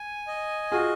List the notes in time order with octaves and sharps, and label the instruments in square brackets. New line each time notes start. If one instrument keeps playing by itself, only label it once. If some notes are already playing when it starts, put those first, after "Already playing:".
Already playing: [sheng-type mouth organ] G#5
D#5
[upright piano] F4 G#4 [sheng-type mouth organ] F#4